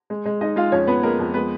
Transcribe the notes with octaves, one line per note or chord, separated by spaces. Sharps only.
G#3
G#3
G#3 D#4 D#5
G#3 F4 F5
F2 C#4 C#5
F2 B3 B4
G#3 A#3 A#4
F2
G#3 B3 B4